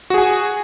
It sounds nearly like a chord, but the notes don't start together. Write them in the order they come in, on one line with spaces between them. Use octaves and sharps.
F#4 G#4 G#5